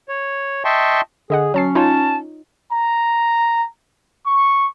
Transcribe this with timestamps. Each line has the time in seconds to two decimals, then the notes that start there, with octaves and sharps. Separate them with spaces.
0.09 C#5
0.65 D#5 E5 G5 A5 C6 C#6
1.30 D3 G#4 D#5 F#5
1.54 F#3 C#4 A5 C7
1.75 D#4 F4 C#5 A5
2.72 A#5
4.26 C#6